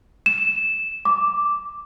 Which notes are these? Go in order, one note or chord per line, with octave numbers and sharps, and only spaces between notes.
E7
D6